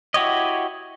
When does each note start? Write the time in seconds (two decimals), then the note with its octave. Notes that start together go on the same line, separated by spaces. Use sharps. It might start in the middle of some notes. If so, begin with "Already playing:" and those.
0.14 E4 F#4 G4 C#5 D#5